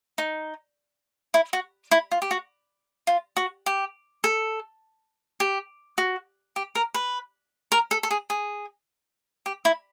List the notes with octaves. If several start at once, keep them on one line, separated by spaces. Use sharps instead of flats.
D#4
E4
F#4
E4
F4
G4
F#4
F4
F#4
G4
A4
G4
F#4
G4
A#4
B4
A#4
A4
A4
G#4
G#4
G4
E4